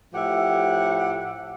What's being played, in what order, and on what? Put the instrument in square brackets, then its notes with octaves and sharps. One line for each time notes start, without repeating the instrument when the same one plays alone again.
[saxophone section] A2 F3 G4 E5 F#5